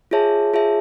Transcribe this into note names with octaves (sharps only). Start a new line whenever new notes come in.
F4 G#4 C#5 E5 A5
F4 G#4 C#5 E5 A5